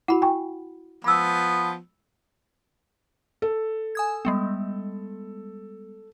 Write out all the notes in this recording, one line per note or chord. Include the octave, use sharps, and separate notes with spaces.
E4 F#4 F#5 B5
G5 G#5 C#6
F3 B3 B5 E6
A4
G#5 D#6 G#6
G3 G#3 B3